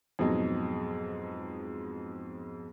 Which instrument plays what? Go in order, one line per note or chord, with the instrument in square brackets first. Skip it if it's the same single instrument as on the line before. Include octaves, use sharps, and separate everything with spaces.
[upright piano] F2 G#2 B2 F#3 D#4